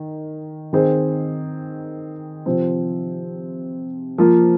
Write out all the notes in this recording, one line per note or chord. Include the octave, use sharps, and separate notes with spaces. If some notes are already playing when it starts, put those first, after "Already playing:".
Already playing: D#3
D#3 C4 G#4
C3 F3 C4
F3 A#3 F4